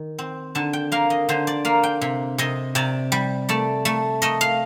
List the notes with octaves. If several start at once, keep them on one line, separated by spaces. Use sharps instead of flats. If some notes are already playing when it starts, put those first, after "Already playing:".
Already playing: D#3
C4
D3 A5
G5
A#3 F5
D#5
D3 C5
D5
A#3 F5
G5
C3
C3 D#5
C3 D5
G3
A3 D5
A3
A3 D#5
F5